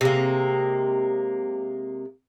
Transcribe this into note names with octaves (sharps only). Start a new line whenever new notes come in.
C3 G#3 A#3